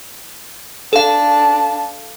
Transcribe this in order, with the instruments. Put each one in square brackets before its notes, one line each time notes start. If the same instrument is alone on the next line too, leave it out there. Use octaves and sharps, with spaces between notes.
[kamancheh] D4 A5 [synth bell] A4 F5